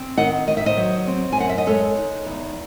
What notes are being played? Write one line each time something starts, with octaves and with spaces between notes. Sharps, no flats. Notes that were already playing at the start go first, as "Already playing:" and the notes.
Already playing: C4
D#3 D#5 F#5
D#3 D#5
E5
C5 D#5
F#3
C4
G#5
F#2 F#5
E5
D#5
G#3 A4 C#5
D#4
E2